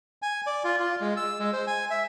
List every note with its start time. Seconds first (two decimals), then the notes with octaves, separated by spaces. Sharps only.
0.22 G#5
0.47 D5
0.64 F4
0.80 F4
1.01 G#3
1.17 E6
1.39 G#3
1.53 C5
1.67 G#5
1.90 E5